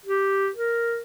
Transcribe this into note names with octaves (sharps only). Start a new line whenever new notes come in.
G4
A#4